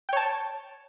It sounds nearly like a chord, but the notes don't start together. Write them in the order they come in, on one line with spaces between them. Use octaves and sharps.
G5 C#5 A5